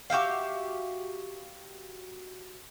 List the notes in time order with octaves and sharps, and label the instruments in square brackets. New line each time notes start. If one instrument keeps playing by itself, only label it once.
[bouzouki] F#4 G4 E5 F5